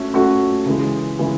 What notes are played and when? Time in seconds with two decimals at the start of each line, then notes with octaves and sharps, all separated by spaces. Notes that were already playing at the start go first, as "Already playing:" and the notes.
Already playing: A3 C#4 F#4
0.14 A3 C#4 F#4
0.66 C#3 E3 G#3
1.19 C#3 E3 G#3